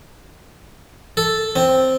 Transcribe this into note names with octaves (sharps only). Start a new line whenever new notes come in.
A4
C4